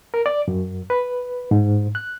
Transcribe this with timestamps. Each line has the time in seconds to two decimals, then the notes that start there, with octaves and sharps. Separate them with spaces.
0.14 A#4
0.26 D5
0.48 F#2
0.90 B4
1.51 G#2
1.95 F#6